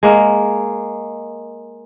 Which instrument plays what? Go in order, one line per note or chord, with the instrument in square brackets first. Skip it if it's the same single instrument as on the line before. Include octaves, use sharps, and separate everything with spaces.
[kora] G#3 A#3